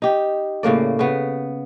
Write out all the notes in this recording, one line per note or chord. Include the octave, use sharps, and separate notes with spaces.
D#4 G4
A2 C#3 A#3 D5
C#3 B3